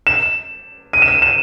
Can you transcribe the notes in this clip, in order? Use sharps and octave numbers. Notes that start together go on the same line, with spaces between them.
E7
D#7
E7
D#7
E7